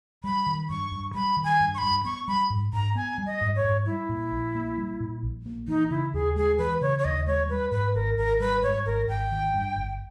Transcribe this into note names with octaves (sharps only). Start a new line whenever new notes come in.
G3 B5
D#3
G2 C#6
G2
G3 B5
D#3
G#5
G2
C#6
G2 B5
B3 C#6
G3 B5
G#2
G#2 A#5
B3 G#5
G3
D#5
G#2
C#5
G#2
G3 E4
A#2
A#1
A#3
G3
A#2
A#1
A#3
E3 D#4
C#3 E4
D#2 G#4
G#3 G#4
E3 B4
C#3 C#5
C#5
D#2 D#5
G#3 C#5
G3 B4
G#2 B4
G#1 A#4
G#1 A#4
G3 B4
G#2 C#5
G#1 A#4
G#1 G5
D#3
G2
G1